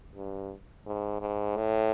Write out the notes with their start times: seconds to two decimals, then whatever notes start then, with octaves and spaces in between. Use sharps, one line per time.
0.15 G2
0.86 G#2
1.21 G#2
1.57 A2